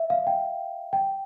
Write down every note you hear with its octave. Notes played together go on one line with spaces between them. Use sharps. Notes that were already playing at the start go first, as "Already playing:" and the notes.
Already playing: E5
F5
G5
G5